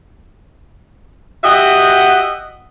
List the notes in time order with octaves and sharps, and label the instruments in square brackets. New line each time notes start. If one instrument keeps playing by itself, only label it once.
[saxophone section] F#4 G4 D#5 E5 F#5